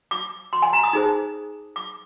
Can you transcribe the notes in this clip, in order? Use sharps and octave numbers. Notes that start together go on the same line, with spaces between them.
D6
C6
G#5
A#5
D#6
D#4 G#4 C5
D6